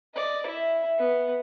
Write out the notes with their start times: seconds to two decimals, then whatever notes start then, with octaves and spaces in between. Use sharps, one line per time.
0.14 D5 D#5
0.46 E4 E5
0.99 B3